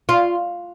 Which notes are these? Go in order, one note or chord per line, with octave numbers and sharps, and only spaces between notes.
F4